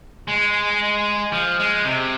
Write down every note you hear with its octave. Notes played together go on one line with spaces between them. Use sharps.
G#3
F3
G#3
C3